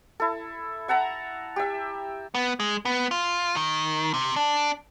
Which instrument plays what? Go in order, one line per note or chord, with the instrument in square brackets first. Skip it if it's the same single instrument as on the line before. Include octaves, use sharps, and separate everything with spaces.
[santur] E4 A4
E5 F#5 A5 A#5
G4 E5
[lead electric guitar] B3
G#3
B3
F4
D#3
C3
D4